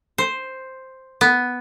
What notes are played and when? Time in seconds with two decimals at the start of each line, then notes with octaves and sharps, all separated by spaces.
0.18 C5
1.21 B3